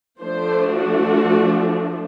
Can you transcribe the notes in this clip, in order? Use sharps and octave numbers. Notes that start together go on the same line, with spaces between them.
F3 A3 D4 C5
F#4